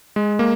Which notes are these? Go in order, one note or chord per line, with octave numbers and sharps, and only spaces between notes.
G#3
A#3